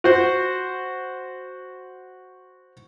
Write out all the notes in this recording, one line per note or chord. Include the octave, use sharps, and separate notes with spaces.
F#4 C5